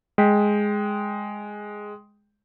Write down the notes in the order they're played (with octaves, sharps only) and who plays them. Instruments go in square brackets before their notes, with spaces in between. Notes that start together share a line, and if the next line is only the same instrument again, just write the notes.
[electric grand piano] G#3 G5 B6